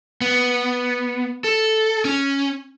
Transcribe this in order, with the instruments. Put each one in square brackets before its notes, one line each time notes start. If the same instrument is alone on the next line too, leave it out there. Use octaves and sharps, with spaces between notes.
[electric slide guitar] B3
A4
C#4